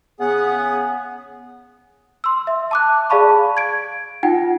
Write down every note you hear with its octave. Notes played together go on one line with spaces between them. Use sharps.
C#3 B3 G#4 F#5
C6 E6
E5
A5 D6 F#6
G#4 D5 F5 A5 B5 C#6
G#6 D7
D#4 F4 F#5 G5